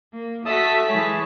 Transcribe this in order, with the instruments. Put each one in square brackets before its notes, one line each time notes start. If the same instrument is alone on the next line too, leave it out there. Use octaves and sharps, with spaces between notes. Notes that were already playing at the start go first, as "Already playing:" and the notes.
[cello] A#3
[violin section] A3 B6 [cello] F#4 E5 [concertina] A4 A5 D#6
[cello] E3 G#3 [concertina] G#4 C#5 A5